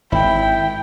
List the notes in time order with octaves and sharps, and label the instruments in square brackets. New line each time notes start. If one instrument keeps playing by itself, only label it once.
[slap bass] G#1 [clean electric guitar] E4 [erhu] G5